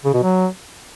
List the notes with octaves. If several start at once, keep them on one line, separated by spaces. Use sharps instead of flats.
C#3
B2
F#3